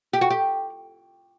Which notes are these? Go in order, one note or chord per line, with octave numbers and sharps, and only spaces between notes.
G4
F#4
G4